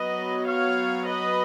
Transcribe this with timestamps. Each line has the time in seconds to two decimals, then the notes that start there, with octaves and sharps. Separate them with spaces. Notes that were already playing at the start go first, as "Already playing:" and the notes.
Already playing: F#3 B3 B4 D#5
0.47 C#5 F5
1.08 B4 D#5